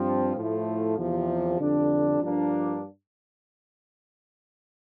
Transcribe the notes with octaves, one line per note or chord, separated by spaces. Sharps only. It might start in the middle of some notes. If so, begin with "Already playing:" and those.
Already playing: G2 F3 C4
A2 F3 A3 E4
E2 C3 F3
F2 D3 G3 D4
G2 F3 A#3 D4